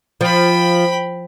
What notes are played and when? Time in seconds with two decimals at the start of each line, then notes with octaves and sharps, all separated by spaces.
0.21 F3 G5 B5